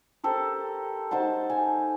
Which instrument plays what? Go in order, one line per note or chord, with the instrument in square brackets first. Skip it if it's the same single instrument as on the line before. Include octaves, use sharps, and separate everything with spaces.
[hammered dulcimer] G4 A4 A#4 C5
D#4 C5 F#5 A5
G#5